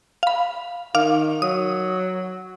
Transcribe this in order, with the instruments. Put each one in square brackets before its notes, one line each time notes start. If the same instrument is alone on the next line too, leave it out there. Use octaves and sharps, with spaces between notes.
[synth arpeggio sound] F5 B5
[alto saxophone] D#3 [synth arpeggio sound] F5 D6 F6
[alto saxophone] F#3 [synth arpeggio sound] D#6